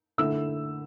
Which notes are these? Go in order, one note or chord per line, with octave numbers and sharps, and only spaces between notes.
D3 A3 E4 E6